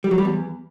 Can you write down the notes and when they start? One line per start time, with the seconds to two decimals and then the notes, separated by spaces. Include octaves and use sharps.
0.04 G3
0.11 F#3
0.18 G3
0.25 E2